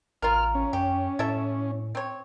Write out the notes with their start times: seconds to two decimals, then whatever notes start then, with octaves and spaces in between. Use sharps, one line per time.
0.22 A1 F4 A#4 F6
0.55 C#4
0.73 F#2 G4
1.19 A2 E4 A4 E5
1.95 C4 C#5